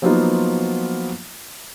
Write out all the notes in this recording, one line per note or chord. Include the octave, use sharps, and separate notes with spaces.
F3 F#3 A#3 B3 D#4 F4